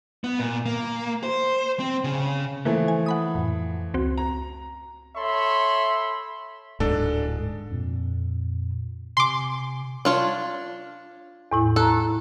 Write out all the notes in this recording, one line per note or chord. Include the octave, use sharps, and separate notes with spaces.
B3
A#2
A#3
C5
C4
C#3
E3 F3 A3 A#3
G#5
F#5 B5 D#6
F2 A2
C#2 C4 F#4
A#5
A4 C#5 E5 B5 C6
D1 G#2 D4 A4
F2 A#2
C3 G#5 C6 D6
D4 F4 C#5
E2 A2 E4
A4 A#5 F#6